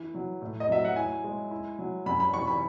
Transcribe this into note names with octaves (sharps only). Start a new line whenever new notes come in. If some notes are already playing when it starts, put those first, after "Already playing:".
Already playing: E3 E4
F#3
A2
D#5
F#3 E5
F#5
E4 G#5
G#3
E4
F#3
F#2 B5
B5
E3 C#6
B5